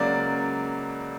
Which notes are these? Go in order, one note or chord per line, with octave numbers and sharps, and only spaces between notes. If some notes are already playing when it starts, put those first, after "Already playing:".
Already playing: C#2 C#3 F#3 A#3 D5